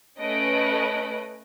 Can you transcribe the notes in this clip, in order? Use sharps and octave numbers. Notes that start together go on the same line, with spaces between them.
A3 C#4 B4 D#5 D7